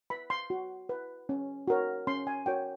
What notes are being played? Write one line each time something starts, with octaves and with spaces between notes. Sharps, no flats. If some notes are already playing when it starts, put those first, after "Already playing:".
B4 B5
C6
F#4
B4
C#4
F#4 A#4 C#5
C#4 C6
G#5
F#4 A#4 C#5 G5